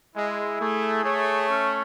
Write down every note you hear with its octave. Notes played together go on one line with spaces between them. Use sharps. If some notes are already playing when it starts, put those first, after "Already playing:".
G#3 E4
A3 G#4
A3 C#5
C#4